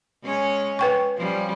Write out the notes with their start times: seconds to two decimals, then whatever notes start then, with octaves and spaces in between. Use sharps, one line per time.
0.24 G#3 C#4 C#5
0.79 B4 G5 C#6
1.17 F3 G3 C#4